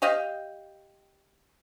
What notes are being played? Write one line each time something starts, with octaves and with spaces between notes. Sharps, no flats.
G4 D#5 F5 G5